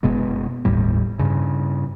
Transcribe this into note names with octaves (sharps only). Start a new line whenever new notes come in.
F#1 B2 G#3 B3
G1 D#2 A2 G3
G2 C#3